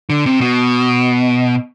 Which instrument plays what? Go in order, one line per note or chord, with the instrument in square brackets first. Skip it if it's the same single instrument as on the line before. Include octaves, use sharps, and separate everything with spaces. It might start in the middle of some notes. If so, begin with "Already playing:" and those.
[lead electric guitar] D3
C3
B2